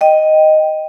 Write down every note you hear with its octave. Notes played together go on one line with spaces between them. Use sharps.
D#5 G5